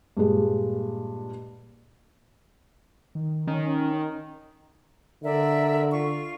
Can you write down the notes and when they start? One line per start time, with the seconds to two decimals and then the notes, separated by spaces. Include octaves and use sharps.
0.17 G2 A#2 G#3
3.15 D#3
3.47 D#3 C#4
5.23 D3 A#4 D5 E5
5.91 F4 C#6